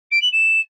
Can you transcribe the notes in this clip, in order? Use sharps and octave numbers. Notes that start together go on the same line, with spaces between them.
D7
F#7
E7